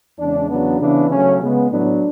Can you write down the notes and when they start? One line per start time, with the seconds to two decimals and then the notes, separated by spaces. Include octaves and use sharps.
0.18 E2 C#3 G#3 D4
0.49 E2 C#3 F#3 B3 D4
0.79 C#3 E3 B3 D4
1.10 C#3 F#3 A3 C#4
1.40 C#3 G#3 B3
1.70 A2 F#3 B3 D4